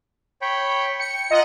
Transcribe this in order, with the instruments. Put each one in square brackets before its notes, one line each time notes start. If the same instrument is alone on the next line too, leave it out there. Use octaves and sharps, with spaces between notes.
[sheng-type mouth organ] C#5 G5 B5
[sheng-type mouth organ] G5 [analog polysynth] C#7
[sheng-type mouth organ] F4 A#5 [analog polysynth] D#5 F#5